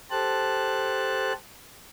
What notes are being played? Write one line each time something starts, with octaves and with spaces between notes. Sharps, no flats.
G4 A4 C5 A5 F#6